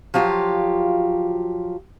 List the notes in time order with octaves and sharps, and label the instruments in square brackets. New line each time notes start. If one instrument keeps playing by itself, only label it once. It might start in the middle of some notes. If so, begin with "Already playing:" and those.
[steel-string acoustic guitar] F3 F#3 F4 G4